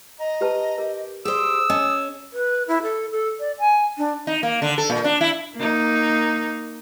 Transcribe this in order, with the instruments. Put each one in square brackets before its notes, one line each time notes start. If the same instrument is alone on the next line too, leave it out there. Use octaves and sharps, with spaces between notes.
[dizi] D#5 [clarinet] A#5
[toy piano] G4 B4 A5
[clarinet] G4 [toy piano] A#4
[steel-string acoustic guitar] G4 C5 [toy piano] G#4 D5 [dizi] D#6 [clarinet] E6
[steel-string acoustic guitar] C#4 [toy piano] D#5 G#5 A5
[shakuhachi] B4
E4
A4
A4
D5
G#5
D4
[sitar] D#4
A#3
D3
A4
A#2
D4
E4
[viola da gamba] A#3 D#4